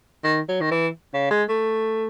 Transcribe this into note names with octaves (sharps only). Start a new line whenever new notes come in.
D#3
F#3
D#3
E3
C#3
G#3
A3